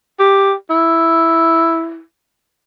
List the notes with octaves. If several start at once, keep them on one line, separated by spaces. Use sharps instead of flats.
G4
E4